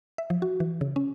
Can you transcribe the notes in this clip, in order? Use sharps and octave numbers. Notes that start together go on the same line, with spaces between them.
E5
F3
F#4
E3
C#3
C#4